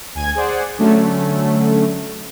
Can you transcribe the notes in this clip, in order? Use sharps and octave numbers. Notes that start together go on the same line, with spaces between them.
D2 G#5 G#6
G#4 C5 D5 F#5
D3 F#3 A3 C#4